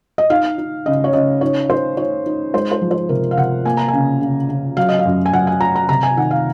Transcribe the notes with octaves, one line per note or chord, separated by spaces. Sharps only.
D#5
D#4 F5
D#4
C#3 D#5
C#5
C#3 D#5
D#4 C#5
D#4 C5
D#4 C#5
D#4
G#3 C5
C5
F3
C5
C3 A#4
F5
C3 F#5
A#3 G#5
A#5
C#3 G#5
C#3
C#3
F#3 F5
D#5
F5
F#2
G#5
F#2 F#5
G#5
F#3 A#5
A#5
C3 A#5
G#5
D#3 F#5
F5